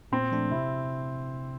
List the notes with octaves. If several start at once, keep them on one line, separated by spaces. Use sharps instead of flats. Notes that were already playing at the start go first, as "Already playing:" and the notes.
A#2 C4
F3 A3 D4
C3 E4